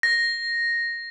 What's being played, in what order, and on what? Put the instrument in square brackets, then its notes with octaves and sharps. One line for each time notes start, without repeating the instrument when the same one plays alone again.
[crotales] A#6